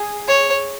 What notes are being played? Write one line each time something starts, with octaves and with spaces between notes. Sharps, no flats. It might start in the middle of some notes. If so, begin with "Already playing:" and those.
Already playing: G#4
C#5